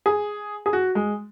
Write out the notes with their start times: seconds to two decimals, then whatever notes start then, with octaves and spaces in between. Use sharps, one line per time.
0.06 G#4
0.66 G#4
0.73 F#4
0.95 G#3